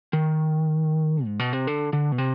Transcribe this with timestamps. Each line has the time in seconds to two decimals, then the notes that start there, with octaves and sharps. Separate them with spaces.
0.13 D#3
1.25 G#2
1.39 B2
1.53 C3
1.67 D3
1.93 D3
2.12 B2
2.18 C3